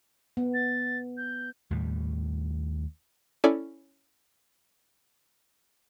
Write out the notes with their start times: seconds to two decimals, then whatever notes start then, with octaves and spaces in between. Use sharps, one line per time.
0.37 B3
0.54 A6
1.17 G6
1.71 D#2 A2 G3
3.44 C#4 E4 A4 D5 E5 G#5